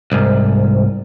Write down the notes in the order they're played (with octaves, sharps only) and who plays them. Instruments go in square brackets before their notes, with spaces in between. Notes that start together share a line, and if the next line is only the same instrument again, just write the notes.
[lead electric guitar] C2 G#2